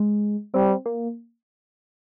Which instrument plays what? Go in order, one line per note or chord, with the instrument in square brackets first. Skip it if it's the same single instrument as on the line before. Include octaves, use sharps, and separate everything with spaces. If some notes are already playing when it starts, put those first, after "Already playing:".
Already playing: [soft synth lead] G#3
[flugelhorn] G3 [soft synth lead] C4
[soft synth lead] A#3